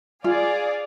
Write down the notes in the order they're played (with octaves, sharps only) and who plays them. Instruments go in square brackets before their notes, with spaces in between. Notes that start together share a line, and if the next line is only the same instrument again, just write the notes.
[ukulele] F4 [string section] G#4 D5 F5